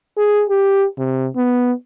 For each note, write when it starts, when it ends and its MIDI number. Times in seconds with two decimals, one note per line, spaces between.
0.18 0.44 68
0.49 0.86 67
0.98 1.27 48
1.36 1.72 59